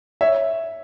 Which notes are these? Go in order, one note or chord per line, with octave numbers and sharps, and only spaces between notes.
C#5 E5